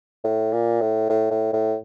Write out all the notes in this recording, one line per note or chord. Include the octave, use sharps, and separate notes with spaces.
A2
A#2
A2
A2
A2
A2